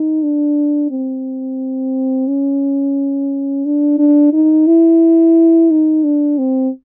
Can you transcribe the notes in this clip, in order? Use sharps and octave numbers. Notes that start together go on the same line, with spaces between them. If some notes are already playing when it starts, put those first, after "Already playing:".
Already playing: D#4
D4
C4
C#4
D4
D4
D#4
E4
D#4
D4
C4